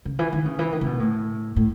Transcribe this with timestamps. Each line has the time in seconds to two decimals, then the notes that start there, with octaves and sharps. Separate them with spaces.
0.05 C#3
0.19 E3
0.33 D#3
0.46 C#3
0.59 E3
0.72 D#3
0.81 C#3
0.86 B2
1.00 A2
1.56 A2